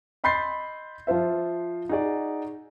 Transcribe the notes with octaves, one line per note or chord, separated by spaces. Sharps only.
D#5 B5 C6 G6 A6 C7
F3 F4 C5 E5
D#4 F#4 G#4 D5